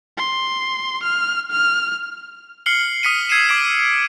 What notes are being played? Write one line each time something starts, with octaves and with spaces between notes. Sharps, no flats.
C6
F6
F6
F6 C7 C#7 F#7 G7
D#6 F6 B6 C#7 D#7
E6 G#6 C7 C#7 D#7 E7
D6 B6 C7 D7